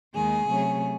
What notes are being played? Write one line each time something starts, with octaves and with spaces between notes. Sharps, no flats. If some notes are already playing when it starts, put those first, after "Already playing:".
D#2 D#3 G#3 G#4
C3 F#3 A3 C#4